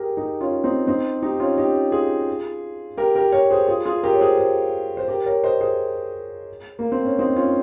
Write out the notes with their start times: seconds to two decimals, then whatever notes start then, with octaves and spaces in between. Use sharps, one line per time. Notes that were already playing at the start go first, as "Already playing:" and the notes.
Already playing: G4 G#4 A#4
0.17 D#4 G4
0.41 C#4 F4
0.64 C4 D#4
0.87 C4 D#4
1.22 D#4 G4
1.40 C#4 F4
1.58 D#4 G4
1.92 F4 G#4
2.97 G4 A#4
3.15 G4 A#4
3.32 A#4 C#5
3.51 G#4 C5
3.67 F4 G#4
3.85 F4 G#4
4.03 G4 A#4
4.13 C#5
4.20 G#4 C5
4.38 G#4 C5
4.97 C5
5.08 G4 A#4
5.26 A#4 C#5
5.44 C5 D#5
5.61 G#4 C5
6.79 A#3
6.92 C4
7.05 C#4
7.19 C4 D#4
7.36 C#4 F4